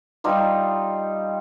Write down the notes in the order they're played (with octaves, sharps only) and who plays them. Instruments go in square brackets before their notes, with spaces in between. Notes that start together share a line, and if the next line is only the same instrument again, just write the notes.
[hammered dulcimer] G3 D#4 F4